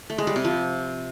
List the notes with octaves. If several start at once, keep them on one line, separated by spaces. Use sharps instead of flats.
A3
G#3
G3
C3
F3